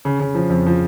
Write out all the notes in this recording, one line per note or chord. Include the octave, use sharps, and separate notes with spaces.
C#3
C#3
F3
F2
F3